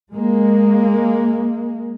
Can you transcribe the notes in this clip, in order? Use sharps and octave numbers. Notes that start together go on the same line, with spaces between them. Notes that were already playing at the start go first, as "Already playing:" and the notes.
G#3 A#3